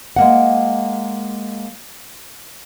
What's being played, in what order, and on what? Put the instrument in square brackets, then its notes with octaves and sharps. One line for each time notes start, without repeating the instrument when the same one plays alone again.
[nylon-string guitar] G#3 A#3 F#5